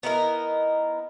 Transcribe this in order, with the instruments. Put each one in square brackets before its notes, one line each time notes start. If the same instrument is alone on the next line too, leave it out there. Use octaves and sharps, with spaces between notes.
[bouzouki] B3 D#4 E4 A#4